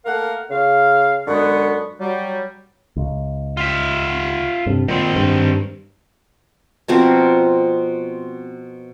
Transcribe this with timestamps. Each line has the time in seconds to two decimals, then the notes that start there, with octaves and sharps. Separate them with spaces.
0.05 A3 A#3 A#4 F5 F#5
0.50 C#3 F5
1.27 F#2 D3 G#3 B3 C#6
2.00 F#3 G3
2.97 C#2
3.57 F4 E5
4.66 G2 C3
4.88 A#2 D#3 C4
5.16 G2
6.88 B2 F3 C4 A#4